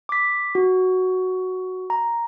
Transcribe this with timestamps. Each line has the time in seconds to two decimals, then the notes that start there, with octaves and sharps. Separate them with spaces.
0.09 D6 B6
0.55 F#4
1.90 A#5